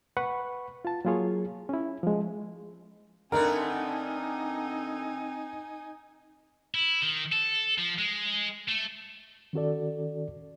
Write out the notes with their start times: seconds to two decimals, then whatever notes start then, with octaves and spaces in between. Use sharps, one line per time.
0.17 B4 F#5 B5 C#6
0.85 F4 A5
1.05 F#3 A#3 F4 G#4 C#5
1.69 C#4 E4
2.03 F3 G#3
3.32 D3 A3 B3 C4 D#4 A#4 G#5
6.74 E4
7.02 D#3
7.32 A4
7.78 F3
7.98 G#3
8.69 A3
9.53 D#3 C#4 F#4 A4 D5